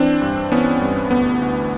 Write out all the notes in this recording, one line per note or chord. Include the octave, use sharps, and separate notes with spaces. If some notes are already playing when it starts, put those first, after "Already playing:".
Already playing: E3 C4 D4
G2
E3 B3 C#4
G2
D2 B3
D2